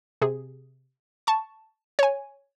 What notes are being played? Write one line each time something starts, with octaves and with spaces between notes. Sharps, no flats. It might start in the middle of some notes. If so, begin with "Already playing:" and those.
C3 G#4
A5 C#6
C#5 G#5